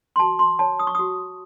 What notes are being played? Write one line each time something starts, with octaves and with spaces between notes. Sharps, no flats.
C6
F#4 A5
C6
C#5 A5
D#6
C#6
F#4 D#6